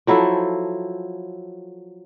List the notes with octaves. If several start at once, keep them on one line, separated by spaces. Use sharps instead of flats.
F3 F#3 E4 A4